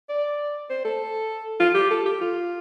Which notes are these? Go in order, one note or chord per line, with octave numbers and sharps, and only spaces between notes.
D5
C5
A4
F4
G4
A4
G4
F4